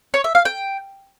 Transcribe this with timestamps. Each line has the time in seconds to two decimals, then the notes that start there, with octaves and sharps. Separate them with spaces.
0.14 C#5
0.24 E5
0.35 F5
0.45 G5